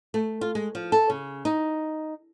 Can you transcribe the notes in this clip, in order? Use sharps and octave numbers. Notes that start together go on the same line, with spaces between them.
A3
F4
G#3
F3
A4
C#3
D#4